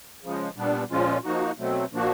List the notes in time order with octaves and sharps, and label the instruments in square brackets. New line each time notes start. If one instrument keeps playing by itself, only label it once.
[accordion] C#3 F3 G#3
A#2 G3 B3 D4
A#2 F3 G#3 C#4 F4
F3 A#3 D#4 F#4
B2 F#3 A3 C4
A#2 F3 A#3 D4 F#4